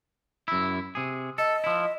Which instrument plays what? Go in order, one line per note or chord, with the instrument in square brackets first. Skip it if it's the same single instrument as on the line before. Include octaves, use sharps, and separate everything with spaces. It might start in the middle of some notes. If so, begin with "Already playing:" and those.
[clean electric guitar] F#2 E4
C3 G#4
[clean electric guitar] A4 [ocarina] D#5
[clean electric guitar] F3 E4